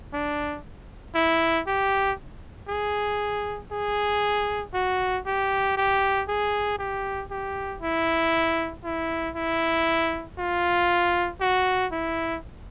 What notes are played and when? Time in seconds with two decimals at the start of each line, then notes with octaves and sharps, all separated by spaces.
0.13 D4
1.15 E4
1.67 G4
2.68 G#4
3.72 G#4
4.74 F#4
5.26 G4
5.77 G4
6.28 G#4
6.79 G4
7.31 G4
7.82 E4
8.84 E4
9.36 E4
10.38 F4
11.41 F#4
11.92 E4